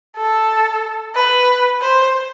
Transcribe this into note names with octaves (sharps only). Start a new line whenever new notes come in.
A4
B4
C5